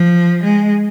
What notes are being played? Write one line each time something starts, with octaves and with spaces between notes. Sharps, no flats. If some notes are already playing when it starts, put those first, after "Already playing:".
Already playing: F3
G#3